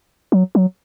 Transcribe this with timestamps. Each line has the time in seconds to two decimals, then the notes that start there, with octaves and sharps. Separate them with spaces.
0.32 F#3
0.55 F#3